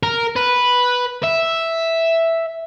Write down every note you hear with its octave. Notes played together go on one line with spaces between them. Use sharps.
A#4
B4
E5